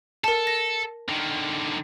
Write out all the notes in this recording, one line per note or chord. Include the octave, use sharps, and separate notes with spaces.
A4 A#4 A5
A#6
D3 D#3